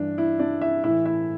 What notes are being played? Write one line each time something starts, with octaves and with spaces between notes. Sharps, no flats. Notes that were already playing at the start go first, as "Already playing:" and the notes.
Already playing: G2 E3 D4
E4
D4 D5
E4 E5
A2 E3 E4 E5
E4 E5